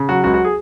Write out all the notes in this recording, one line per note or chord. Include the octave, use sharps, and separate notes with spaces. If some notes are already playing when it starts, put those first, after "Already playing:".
Already playing: C#3
F#3 F#4
C#2 F#4
F#4
G#4